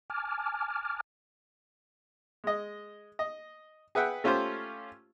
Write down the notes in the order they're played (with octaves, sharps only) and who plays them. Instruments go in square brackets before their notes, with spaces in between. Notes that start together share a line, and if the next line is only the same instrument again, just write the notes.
[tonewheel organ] G#5 A5 D6 F6
[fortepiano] G#3 D#5
D#5
G#4 B4 E5 F#5 G5
A3 C#4 F4 G4 C5